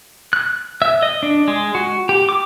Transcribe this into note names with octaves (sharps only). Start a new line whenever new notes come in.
F#6
E5
D#5
D4
G#3
F#4
G4
D6